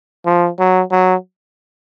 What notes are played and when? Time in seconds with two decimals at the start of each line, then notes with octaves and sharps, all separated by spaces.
0.26 F3
0.59 F#3
0.91 F#3